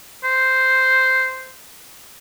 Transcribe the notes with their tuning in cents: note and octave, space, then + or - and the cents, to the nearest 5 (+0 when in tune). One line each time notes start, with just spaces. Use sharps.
C5 -5